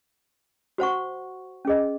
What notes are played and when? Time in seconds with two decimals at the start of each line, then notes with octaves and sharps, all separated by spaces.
0.78 F#4 C5 F#5 C#6
1.65 C#4 G#4 D#5